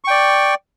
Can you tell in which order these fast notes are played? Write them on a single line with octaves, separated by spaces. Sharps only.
C#6 G5 D5